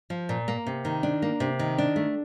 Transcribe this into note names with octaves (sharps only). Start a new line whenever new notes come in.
F3
A#2
A#3
C3
D#3
D4
A#3
C3
D#3
D4
A3